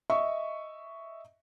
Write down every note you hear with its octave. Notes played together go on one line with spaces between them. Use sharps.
D#5 E5 C#6